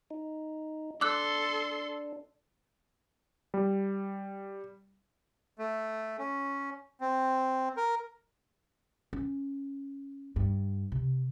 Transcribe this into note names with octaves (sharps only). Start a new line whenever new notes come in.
D#4
D4 A4 C6 D6 E6 F#6
G3
A3
C#4
C4
A#4
C#4
G2
C3